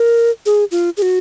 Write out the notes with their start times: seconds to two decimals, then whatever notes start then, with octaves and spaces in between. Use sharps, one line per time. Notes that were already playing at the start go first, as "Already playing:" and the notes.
Already playing: A#4
0.46 G#4
0.71 F4
0.97 G#4
1.02 F#4